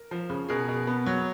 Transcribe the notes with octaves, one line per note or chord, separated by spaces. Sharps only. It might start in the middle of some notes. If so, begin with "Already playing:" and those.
Already playing: A#4
F3
C#3
B2 G#4 A#4
B2
B3
F#3